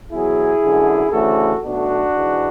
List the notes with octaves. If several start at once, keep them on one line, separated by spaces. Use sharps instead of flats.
E2 B2 F#3 E4 G#4
F#2 D3 G#3
D2 C#3 E3 A3 F#4 A4
B1 B2 A3 D4 F#4
G#2 E3 G#3